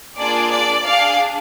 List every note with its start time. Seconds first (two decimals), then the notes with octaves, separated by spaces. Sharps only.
0.18 A#3 D4 F4 G#4 D5
0.52 D5
0.86 D4 G#4 D5 F5